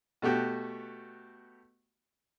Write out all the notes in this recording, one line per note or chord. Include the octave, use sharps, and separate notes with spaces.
B2 A3 F#4 G4